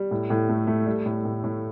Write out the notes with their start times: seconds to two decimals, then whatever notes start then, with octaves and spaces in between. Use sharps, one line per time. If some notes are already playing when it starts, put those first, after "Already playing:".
Already playing: G3
0.11 A2
0.30 A2
0.49 A3
0.67 A3
0.86 G3
1.06 A2
1.25 A2
1.44 A2